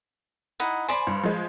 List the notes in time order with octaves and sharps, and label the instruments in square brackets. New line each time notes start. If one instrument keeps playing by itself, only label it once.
[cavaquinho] D#4 E4 F#5
[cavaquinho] C5 D5 B5 [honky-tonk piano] G#5
[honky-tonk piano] G2
F3 G#3